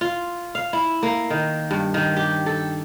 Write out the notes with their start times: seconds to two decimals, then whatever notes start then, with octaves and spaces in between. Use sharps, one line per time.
0.01 F4
0.55 F5
0.73 E4
1.03 A#3
1.30 D#3
1.71 G2
1.94 D#3
2.16 G4
2.46 A4